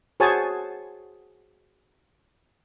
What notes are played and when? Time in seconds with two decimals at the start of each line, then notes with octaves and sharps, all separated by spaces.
0.20 F#4 G#4 C5 C#5 G#5 A5